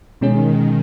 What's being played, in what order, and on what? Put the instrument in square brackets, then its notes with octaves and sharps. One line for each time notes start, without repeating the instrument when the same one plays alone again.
[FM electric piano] B2 G#3 C#4 G#4 [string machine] D#3